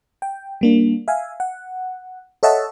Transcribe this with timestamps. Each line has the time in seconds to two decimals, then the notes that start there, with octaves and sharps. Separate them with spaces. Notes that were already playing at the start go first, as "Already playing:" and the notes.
0.22 G5
0.61 G3 A#3 D4
1.08 E5 F5 G#5
1.40 F#5
2.43 A4 C#5 D#5 E5 F#5 A5